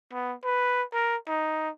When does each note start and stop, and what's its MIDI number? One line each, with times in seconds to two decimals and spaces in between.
0.13 0.34 59
0.44 0.83 71
0.93 1.16 70
1.28 1.69 63